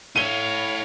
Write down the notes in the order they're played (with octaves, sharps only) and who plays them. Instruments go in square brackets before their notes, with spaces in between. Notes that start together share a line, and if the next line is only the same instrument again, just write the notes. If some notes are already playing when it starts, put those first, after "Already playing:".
[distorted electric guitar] E4 A4 [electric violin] C#5 F5 [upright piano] D#7 G7